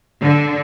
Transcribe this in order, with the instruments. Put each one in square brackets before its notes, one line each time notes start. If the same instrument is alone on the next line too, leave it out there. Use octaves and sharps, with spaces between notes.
[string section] D3